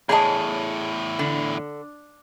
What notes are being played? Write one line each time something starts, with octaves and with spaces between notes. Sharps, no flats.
E2 A2 G#4 C#5 D#5 A5 B5
D3